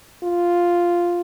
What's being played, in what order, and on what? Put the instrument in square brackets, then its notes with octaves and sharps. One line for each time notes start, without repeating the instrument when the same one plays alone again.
[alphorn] F4